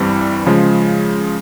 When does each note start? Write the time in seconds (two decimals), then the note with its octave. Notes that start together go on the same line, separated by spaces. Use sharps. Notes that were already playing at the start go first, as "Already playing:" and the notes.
Already playing: G2 E3 G3 C4
0.46 C#3 F3 G#3